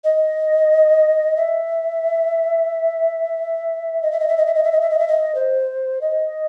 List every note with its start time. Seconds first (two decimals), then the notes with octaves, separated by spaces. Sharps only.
0.04 D#5
1.37 E5
4.03 D#5
4.12 E5
4.20 D#5
4.28 E5
4.37 D#5
4.46 E5
4.55 D#5
4.64 E5
4.72 D#5
4.81 E5
4.90 D#5
4.99 E5
5.08 D#5
5.35 C5
6.01 D#5